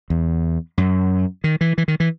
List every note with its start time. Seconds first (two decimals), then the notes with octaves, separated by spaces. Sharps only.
0.10 E2
0.78 F#2
1.44 D#3
1.61 E3
1.78 E3
1.88 D#3
2.00 E3